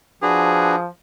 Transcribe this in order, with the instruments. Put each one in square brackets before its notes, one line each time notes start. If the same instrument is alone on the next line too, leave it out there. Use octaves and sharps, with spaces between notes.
[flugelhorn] F3 [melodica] D4 F#4 B4 [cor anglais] G#4